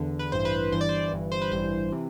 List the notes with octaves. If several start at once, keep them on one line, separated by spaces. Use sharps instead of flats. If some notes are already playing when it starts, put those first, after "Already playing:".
Already playing: E2 D3
B4
A1 G2 E3 C5
B4
G1 G2 E3 C5
D5
C5
G1 G2 E3
C5
B4
A1 G2 E3 C5
C3 E3